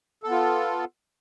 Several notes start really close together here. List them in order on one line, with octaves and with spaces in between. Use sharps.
A4 B3 F4